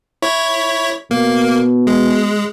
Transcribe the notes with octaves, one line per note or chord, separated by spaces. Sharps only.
E4 C#5
B2 A#3
G#3